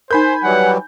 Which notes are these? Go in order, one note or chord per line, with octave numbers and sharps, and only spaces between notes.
D#4 A#4 C5 G#5 B5 G6
E3 F#3 G3 F#5